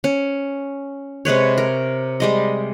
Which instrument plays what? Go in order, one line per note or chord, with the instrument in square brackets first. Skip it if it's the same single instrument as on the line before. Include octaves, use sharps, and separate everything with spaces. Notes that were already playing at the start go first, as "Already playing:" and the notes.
[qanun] C#4
C3 G#3 B4 C#5
A#4
G3 G#3 D#5